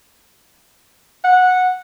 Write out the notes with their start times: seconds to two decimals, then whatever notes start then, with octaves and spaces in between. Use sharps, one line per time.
1.24 F#5